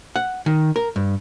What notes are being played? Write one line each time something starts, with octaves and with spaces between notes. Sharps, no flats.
F#5
D#3
A#4
G2